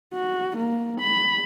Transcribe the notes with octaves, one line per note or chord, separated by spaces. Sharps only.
F#4
A#3
B5